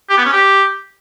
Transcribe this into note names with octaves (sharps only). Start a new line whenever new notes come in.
G4
B3
C#4
G4